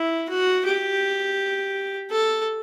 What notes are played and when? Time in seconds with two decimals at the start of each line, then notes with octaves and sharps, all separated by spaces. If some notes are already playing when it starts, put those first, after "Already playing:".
Already playing: E4
0.29 F#4
0.66 G4
2.11 A4